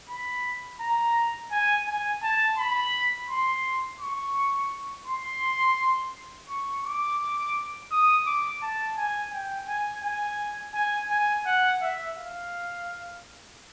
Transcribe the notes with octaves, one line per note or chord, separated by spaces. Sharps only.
B5
A#5
G#5
G#5
A5
B5
C6
C#6
C6
C#6
D6
D#6
D6
A5
G#5
G5
G#5
G#5
G#5
G#5
F#5
E5
F5